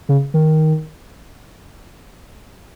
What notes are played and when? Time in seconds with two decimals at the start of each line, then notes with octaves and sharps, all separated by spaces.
0.09 C#3
0.34 D#3